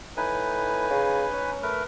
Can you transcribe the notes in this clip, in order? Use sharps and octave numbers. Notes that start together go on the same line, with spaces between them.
A2 D#4 B4 G#5
C#3
C#4
A3 A#4 B4